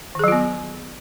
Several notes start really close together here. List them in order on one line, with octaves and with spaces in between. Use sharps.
D#3 G#4 F#3 F4 B3